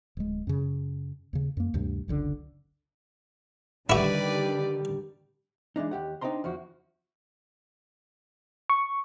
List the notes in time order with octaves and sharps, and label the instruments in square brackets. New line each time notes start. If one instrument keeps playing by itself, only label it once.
[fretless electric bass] D1 G#3
F#2 C#3
D#2 C#3
F#2 A#3
D2 G2 C3
F#1 C#2 D3
[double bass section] D3 D#3 G3 [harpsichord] E4 F#4 [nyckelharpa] G4 [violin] B4 D5
[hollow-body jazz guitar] E3 G#3 D4 D#4
D#2 G4 F#5
D4 D#4 C5 G5 A#5 C6
E2 F3 F#4
[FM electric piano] C#6